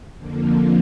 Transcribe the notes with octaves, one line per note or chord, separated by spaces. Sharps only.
F2 D3 F3 A#3